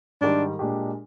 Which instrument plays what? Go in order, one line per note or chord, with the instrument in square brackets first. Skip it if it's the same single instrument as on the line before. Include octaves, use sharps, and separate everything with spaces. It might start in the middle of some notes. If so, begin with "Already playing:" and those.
[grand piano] G#2 D#3 G3 [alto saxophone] D4
[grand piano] A#2 G#3 D4 G4